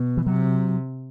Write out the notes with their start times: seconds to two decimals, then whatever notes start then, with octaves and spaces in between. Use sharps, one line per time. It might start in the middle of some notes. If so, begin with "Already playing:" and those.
Already playing: B2 B3
0.17 E3
0.27 C3 F#3